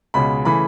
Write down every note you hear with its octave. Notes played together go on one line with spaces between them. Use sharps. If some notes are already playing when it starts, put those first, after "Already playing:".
C#2 B2 G#3 C#4 B5
C#3 E3 A3 B5